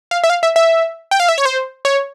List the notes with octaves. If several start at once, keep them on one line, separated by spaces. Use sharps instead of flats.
F5
E5
F5
E5
E5
G5
F5
E5
C#5
C5
C#5